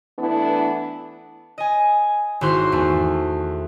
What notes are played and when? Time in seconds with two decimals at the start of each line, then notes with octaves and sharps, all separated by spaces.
0.18 E3 A3 B3 D4 E4
1.58 D#5 G#5
2.41 G#1 E4 F#4 C5 C6
2.72 E2 A3